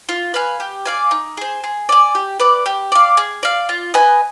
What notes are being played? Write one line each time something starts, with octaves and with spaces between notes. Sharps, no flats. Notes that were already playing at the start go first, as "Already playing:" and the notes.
F4
B4 F5 G#5
G4
D5 F5 G#5
D#4
G#4 C5
G#4
D5 G#5
G4
B4 D5
G4
D5 F5
G#4
D5 F5
F4
B4 D#5 G#5